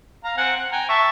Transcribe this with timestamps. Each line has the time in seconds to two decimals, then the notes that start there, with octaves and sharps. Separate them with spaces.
0.24 F5 A#5
0.37 C4 F#5 G#5
0.56 F#5
0.72 G5 G#5 A#5
0.89 E5 A5 C#6